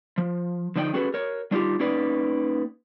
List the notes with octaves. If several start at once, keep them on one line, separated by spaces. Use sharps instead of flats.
F3
D3 F3 D#4 D5 E5 G5
C#4 F#4 G#4 A4 B4
A#4 C#5
G3 D4 D#4 F4 G4
A#3 C#4 D#4 B4 D5